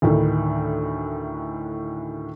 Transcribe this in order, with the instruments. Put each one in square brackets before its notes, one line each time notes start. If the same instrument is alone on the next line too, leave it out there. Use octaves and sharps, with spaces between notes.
[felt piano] D2 A2 D#3 E4